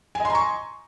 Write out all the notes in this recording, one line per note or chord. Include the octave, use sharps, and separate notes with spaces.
D#5 G#5 A#5 C6 C#6